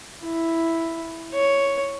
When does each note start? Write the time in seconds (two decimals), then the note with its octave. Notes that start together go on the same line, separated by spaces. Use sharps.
0.23 E4
1.33 C#5